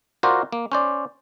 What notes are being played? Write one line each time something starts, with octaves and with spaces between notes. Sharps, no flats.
F4 F#4 A#4 C5 D5
A#3
C#4 C5 D5